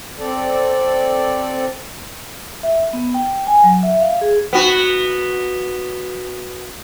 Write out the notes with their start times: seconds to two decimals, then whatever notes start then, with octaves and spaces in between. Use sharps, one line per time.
0.19 C4 A4 D5
2.63 E5
2.93 B3
3.14 G5
3.47 G#5
3.64 F#3
3.83 E5
4.01 F5
4.21 G#4
4.53 B3 F#4